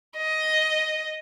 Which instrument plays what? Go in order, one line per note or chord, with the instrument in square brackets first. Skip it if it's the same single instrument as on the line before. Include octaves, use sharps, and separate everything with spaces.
[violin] D#5